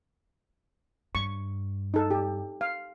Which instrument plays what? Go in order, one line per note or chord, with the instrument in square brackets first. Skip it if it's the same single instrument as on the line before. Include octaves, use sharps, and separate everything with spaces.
[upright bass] G2 [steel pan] C#6
[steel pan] D#4 A4
G4
F5